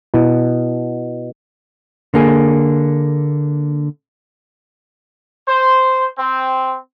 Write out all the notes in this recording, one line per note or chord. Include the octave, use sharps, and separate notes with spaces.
B2 E4
D3 A#3 G#4
C5
C4